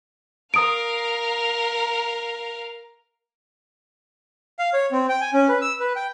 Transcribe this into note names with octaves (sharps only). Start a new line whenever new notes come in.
A#4 F5 D#6 D7
F5
C#5
C4
G5
G#5
C#4
B4
E6
B4
G5